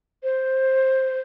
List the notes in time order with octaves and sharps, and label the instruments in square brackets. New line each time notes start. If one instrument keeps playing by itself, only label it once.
[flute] C5